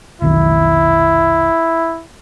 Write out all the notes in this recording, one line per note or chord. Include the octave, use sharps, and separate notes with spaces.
F1 B1 D#3 E4